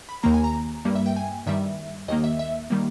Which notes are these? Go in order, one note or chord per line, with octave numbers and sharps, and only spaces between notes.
B5
D#2 D#3 A#3 A#5
G#5
A#5
G2 G3 A#3
E5
G5
G#5
G2 D#3 G3 E5
D#2 D#3 A#3 D#5
E5
E5
D#3 G3 A#3